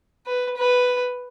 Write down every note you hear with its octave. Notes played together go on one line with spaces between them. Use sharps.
B4
B4